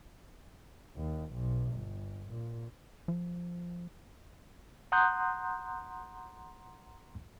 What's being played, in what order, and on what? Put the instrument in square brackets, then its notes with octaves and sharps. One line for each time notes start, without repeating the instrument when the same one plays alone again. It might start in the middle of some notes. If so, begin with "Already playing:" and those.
[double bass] D#2
B1
G1
A#2
[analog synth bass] F3
[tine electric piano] F#5 A#5 C6 D#6 F#6 G6